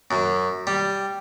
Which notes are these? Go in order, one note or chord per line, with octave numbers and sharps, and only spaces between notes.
F#2
G3